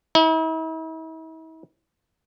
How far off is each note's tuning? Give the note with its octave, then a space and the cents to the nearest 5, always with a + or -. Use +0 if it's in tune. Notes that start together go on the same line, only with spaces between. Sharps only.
E4 -45